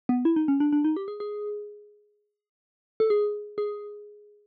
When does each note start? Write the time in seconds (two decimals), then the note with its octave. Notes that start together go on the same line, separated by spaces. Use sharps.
0.09 B3
0.25 E4
0.36 D#4
0.48 C#4
0.60 D4
0.73 D4
0.84 D#4
0.97 G4
1.08 G#4
1.20 G#4
3.00 A4
3.10 G#4
3.58 G#4